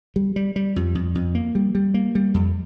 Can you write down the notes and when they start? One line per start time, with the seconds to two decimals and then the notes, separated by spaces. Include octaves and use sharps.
0.16 G3
0.36 G3
0.56 G3
0.76 F2
0.95 F2
1.15 F2
1.35 A#3
1.55 G3
1.75 G3
1.94 A#3
2.15 G3
2.34 F2